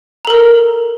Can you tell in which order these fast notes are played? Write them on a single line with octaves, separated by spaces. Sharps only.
A#5 A4 A#4